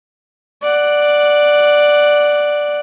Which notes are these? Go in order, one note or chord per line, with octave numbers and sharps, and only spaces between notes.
D5 F#5